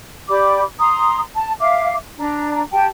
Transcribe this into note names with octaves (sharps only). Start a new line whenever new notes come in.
G4 D5 B5 D6
A#5 C6 D#6
A5
E5 F5 D6
D4 A#5
G4 G5 A5